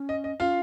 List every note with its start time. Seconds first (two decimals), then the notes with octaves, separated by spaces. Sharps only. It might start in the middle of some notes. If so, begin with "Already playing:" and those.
Already playing: C#4
0.09 D#5
0.24 D#5
0.39 C#4 F4 F5